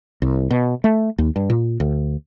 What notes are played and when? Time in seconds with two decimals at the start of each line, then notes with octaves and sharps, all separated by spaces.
0.22 C2
0.51 B2
0.84 A3
1.18 D#2
1.36 G2
1.50 A#2
1.80 D2